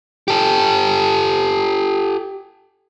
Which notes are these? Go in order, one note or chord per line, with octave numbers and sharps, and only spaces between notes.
G4 A4